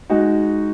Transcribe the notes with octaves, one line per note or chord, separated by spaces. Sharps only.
G#3 D#4 F#4